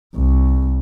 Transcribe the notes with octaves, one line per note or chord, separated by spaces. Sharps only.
C2